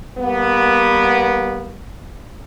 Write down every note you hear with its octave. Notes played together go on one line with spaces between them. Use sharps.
G3 A#3 B3